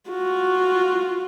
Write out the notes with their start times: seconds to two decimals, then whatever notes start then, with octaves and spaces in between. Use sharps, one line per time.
0.10 F4 F#4